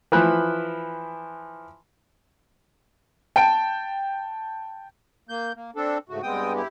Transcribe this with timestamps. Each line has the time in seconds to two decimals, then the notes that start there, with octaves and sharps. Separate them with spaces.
0.12 E3 F3 B5 F#6
3.36 G5 A5 D7
5.29 A#3 G6
5.55 A#3
5.76 C4 D4 A4
6.09 G#2 C#3 A3 F#4
6.22 G2 G#3 B3 C4 G5 D#6
6.55 E4 G4